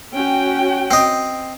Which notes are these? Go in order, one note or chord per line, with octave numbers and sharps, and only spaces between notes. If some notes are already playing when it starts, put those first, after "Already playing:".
C#4 F#4 G5
C4 D#5